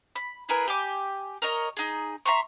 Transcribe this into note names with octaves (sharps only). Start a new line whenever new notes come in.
B5
E4 G#4 A#4 B4
G4 G#5 D6
A#4 C#5 D#5
D#4 G#4
E5 A#5 C6 C#6